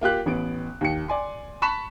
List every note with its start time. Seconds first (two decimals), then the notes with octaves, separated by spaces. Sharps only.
0.01 A#3 F4 G4 F#6
0.26 A1 B3 D7
0.81 D#2 C#7
1.08 D5 G#5 C6
1.62 A5 B5 C#6 F#6 B6 E7